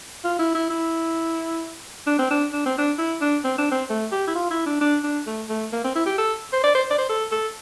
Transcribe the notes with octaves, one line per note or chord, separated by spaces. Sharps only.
F4
E4
E4
E4
D4
C4
D4
D4
C4
D4
E4
D4
C4
D4
C4
A3
G4
E4
F4
E4
D4
D4
D4
A3
A3
A#3
C4
E4
G4
A4
C5
D5
C5
D5
C5
A4
A4